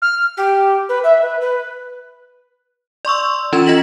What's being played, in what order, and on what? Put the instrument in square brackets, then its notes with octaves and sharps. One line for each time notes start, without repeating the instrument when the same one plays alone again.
[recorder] F6
G4
B4
E5
B4
B4
[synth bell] D5 C6 C#6 E6
E3 C#4 F4 A#5 G#6 E7
F4 D#5 A#6 B6 F#7